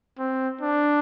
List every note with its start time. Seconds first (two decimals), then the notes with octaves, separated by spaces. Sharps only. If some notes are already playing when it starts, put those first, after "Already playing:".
0.18 C4
0.61 D4